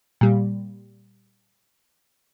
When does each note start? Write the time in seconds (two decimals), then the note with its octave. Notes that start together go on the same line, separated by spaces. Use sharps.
0.21 A#2 G3